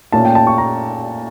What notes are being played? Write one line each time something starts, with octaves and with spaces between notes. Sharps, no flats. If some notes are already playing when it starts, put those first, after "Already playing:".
A#2 A3 C#4 A5
G5
A5
C#6
A#5